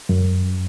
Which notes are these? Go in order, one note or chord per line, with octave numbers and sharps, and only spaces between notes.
F#2